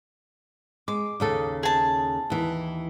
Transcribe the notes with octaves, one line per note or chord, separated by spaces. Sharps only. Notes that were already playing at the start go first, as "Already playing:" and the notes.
G#3 D6
D#2 C#3 A4
G#4 A5
D#2 E3